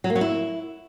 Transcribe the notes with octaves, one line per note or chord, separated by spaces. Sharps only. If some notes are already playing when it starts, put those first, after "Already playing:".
F#3
A#3
F#3
E4